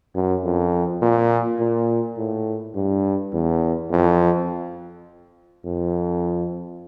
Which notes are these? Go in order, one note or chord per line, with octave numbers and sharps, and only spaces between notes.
F#2
F2
A#2
A#2
A2
G2
E2
F2
F2